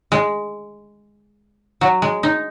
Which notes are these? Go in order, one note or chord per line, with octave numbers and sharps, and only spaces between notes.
G#3
F#3
G#3
D#4